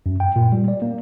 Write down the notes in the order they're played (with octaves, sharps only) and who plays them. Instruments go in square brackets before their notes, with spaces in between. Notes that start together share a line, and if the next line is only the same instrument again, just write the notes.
[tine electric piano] F#2
G5
A#2
G3
D5
A#3